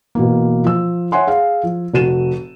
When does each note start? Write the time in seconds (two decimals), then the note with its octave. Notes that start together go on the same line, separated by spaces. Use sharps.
0.15 B2 E3 A#3
0.64 F3 E6
1.12 C#5 E5 F#5 G#5 C6
1.27 G#4 F5
1.63 F3
1.94 F1 F#4 D#7 E7